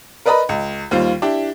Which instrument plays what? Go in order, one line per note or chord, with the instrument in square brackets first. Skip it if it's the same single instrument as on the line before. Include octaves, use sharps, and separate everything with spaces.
[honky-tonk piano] A#4 B4 D5 D#5 A#5 B5
C#2
D#2 G3 F4 C5
D4 E4 G4